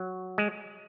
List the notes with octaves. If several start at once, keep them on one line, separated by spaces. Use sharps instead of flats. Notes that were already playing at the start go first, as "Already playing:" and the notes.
Already playing: F#3
G#3